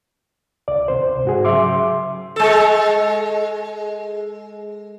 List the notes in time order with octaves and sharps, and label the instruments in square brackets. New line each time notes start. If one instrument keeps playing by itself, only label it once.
[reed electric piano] C#2 D5
C#2 C3 C5
G#2 F#4 G#4
C#3 F#3 E5 C6 D6
[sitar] G#3 A4